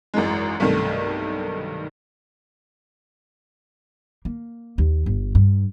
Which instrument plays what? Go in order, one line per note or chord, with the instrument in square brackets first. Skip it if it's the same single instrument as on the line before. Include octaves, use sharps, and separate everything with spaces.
[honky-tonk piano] G#1 F#2 E3 G#3
B1 G2 C3 D#3 A3
[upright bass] A#3
D#2
G1
G2